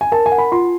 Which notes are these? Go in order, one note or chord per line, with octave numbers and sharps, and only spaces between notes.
G#5
A#4 A5
G#5
F#5
B5
F4 C6